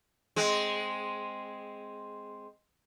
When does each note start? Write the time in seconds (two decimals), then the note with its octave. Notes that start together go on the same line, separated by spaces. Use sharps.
0.36 G#3 C4